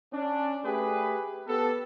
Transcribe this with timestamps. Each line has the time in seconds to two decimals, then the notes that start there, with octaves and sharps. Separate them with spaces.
0.12 C#4 D4
0.64 A3 G4 G#4 B4
1.48 B3 G4 A4